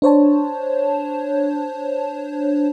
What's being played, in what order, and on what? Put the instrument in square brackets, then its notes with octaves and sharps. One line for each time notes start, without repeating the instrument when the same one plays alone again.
[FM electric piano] D4 C5 C#5 A5